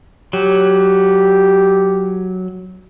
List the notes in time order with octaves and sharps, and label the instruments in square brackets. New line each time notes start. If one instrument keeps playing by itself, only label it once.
[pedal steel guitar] F#3 [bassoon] G4